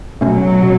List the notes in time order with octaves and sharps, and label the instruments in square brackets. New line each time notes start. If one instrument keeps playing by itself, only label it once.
[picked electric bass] B2 A3 C#4 [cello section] F#3
[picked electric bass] B2